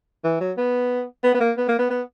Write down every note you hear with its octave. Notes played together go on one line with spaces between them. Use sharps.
E3
F#3
B3
B3
B3
A#3
B3
A#3
B3
B3